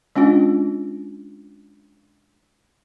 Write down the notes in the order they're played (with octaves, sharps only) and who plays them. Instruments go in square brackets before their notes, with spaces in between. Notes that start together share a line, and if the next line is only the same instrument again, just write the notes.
[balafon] G#3 C#4 D4 F4